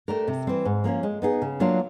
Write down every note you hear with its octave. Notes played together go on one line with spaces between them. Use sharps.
A3 D4 G4 A#4
C3
E3 G3 C4
G#2
F3 A#3 C#4
G#3
B3 D#4 G#4
C#3
F#3 A#3 D4 F4